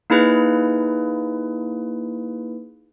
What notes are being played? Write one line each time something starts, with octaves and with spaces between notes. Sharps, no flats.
A#3 D#4 E4 G#4 B4